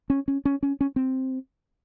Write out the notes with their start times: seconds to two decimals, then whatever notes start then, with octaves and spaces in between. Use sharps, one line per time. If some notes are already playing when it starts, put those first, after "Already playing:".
0.10 C#4
0.28 C#4
0.45 C#4
0.63 C#4
0.81 C#4
0.96 C4